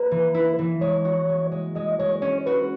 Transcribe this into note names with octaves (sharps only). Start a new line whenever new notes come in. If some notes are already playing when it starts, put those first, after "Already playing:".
Already playing: A#3 B4
E3
E4
E3
G#3 C#5
F#4
G#3
G#3
G#3 D#5
G#3 C#5
C#4 C#5
F#4 B4